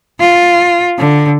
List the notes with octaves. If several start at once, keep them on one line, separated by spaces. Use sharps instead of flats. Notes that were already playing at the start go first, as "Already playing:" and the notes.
F4
D3